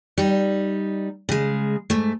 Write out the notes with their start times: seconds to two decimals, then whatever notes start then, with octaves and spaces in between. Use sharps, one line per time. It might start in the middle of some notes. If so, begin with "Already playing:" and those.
0.18 G3 D#4
1.29 C#3 G#3
1.90 G#2 A3